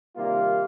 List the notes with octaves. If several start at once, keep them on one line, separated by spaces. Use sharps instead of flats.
C3 D#3 G3 A#3 F4